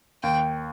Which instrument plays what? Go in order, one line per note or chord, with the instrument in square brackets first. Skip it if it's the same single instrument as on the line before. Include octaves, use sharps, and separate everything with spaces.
[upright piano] D#2 [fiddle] G5